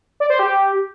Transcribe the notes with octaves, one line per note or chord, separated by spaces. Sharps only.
D5
C5
G4